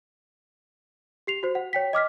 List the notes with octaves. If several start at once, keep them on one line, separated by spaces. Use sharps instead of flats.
G4 C7 F7
F#4 C5
F#5
C#5 G5 B6
D#5 D6 F6 B6